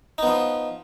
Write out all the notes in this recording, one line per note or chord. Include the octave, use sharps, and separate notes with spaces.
F3 B3 D#4